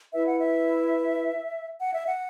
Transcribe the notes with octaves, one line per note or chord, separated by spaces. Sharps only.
E4 B4 E5
F#5
E5
F#5
E5
F#5